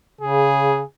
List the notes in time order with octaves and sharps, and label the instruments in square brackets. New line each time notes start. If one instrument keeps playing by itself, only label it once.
[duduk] C#3 [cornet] G#4